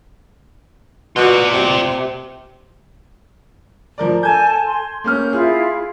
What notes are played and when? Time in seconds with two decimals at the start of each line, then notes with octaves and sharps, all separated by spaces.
1.16 B2 F4 D5
1.53 C3
3.98 F3 A#4 D5
4.23 A4 G#5 A5 G6 G#6
4.65 C6
5.04 A#3 C#4 F6 G6
5.33 E4 F4 G#4